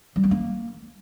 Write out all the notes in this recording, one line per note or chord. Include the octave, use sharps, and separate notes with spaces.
G3
B3
A#3